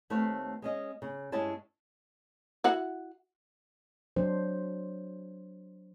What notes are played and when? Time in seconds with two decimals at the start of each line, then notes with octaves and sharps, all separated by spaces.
0.10 D#2 A3 C4 B4 C#5 F5
0.62 G#3 C#4 D#5
1.02 C#3
1.32 G2 G#3 C#4 E4 C#5 A5
2.64 E4 F#4 F#5
4.16 F#3 D4 C5